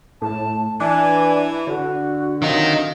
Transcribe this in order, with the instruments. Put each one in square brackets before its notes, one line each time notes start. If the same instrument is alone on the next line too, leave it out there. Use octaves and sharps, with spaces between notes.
[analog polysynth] A2 [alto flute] A5
[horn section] E3 [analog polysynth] D4 [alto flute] G#5
[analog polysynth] D3 [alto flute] F#4
[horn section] C3 F#3 F4 [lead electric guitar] D#3 D#4